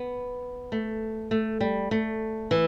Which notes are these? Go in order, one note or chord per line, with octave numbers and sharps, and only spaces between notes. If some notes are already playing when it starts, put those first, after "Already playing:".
Already playing: B3
A3
A3
G3
A3
E3